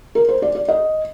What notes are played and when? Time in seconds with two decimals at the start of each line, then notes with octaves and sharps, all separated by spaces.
0.15 A#4
0.29 C5
0.42 D5
0.55 D5
0.68 D#5